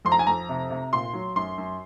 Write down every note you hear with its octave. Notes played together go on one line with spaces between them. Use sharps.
F2 C6
A#5
G#5
F2 A#5
C3
C3
A#2 C6
F#3
F#2 C6
F#2